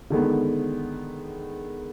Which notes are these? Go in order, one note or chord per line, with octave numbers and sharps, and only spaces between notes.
D3 D#3 G#3 B3